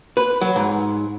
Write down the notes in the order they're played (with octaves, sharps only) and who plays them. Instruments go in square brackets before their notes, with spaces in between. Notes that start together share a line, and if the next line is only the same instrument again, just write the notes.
[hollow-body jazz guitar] B4
F#3
G#2